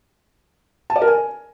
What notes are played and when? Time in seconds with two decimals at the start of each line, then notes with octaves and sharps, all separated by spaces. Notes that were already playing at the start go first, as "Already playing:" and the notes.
0.90 A5
0.96 D5
1.02 A#4
1.07 G#5